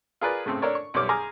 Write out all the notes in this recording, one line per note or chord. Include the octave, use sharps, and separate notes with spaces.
F4 G#4 A#4 B4 D5
A2 C#3 A3 C4
D4 A4 A#4 C#5 D5
C#6
B1 F#2 G3 C#5 D6 F6
G#4 G#5 A#5 D6 D#6 F6